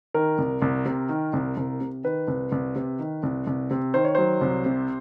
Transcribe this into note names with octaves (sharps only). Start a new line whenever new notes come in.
D#3 A#4
C2
C2
C3
D#3
C2
C2
C3
D#3 B4
C2
C2
C3
D#3
C2
C2
C3
D#3 C5
C#5
F#3 C5
C2
C3